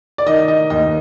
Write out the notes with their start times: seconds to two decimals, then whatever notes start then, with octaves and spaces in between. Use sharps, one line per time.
0.18 D5
0.26 D#3 D#5
0.48 D#5
0.70 D#2 D#5